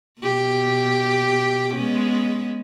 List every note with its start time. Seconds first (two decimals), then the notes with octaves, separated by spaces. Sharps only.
0.21 B2 G4
1.75 G#3 B3 C#4